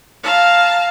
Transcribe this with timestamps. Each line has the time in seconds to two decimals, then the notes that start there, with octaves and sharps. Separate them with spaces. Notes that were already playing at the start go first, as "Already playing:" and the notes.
0.23 F5 A5 A#5